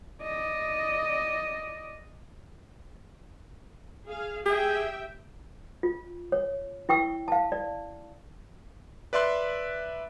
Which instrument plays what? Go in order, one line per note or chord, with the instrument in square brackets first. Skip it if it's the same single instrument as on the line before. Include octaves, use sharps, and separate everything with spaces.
[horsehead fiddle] D5 D#5
[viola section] G#4 F5
[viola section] G4 E5 G5 [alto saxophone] G#4
[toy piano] F4
C#5
E4 G5 C#6 E6
F5 A5
D5
[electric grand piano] B4 D5 E5 C6 F#6